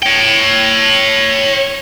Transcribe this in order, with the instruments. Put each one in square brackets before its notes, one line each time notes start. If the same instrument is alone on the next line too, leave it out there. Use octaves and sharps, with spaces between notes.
[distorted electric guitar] C#5 G5